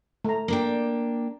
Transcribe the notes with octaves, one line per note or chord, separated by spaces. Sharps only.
A3 A#5
A#3 D4 G5